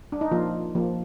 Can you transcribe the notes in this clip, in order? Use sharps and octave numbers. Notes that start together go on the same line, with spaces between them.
D4
D#4
F3 A#3 F4
F3 A#3